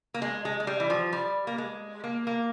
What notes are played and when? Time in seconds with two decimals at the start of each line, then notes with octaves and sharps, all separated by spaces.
0.14 A#3
0.22 G#3
0.45 G#3
0.60 G#3
0.67 G3
0.80 E3
0.90 F3
1.13 G3
1.47 A#3
1.58 G#3
2.04 A#3
2.27 A#3